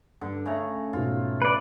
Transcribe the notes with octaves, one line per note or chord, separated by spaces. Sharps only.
G2 D3
C#3 A3 A5 A#5
G#2 B2 F4
B4 D5